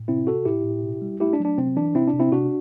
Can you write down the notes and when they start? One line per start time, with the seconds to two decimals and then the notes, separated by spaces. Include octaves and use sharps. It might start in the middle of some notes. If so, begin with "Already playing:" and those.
Already playing: A2
0.08 C3 C4 E4
0.27 C3 F#4 A4
0.45 A2 E4 G4
0.64 A2
0.83 B2
1.02 G3
1.20 A3 E4 G4
1.33 D4
1.40 F#3
1.45 D4
1.58 C3 C4
1.76 E3 D4
1.95 C3 C4 E4
2.07 D4
2.14 C3
2.20 C4 E4
2.32 C3 D4 F#4